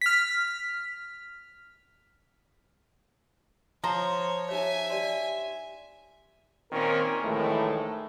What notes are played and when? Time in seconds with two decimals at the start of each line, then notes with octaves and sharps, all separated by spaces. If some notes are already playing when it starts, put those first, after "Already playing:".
0.01 F6 B6
3.84 F3 C5 C#5 A#5
4.49 D#4 G4 C#5 E5 G#5
4.90 G4 D5 C6
6.72 A#2 D#3 C4 C#4 A#4
7.23 A#1 A2 D#3 E3 G#3 A3